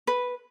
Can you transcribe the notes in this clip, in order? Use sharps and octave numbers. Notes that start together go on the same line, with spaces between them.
B4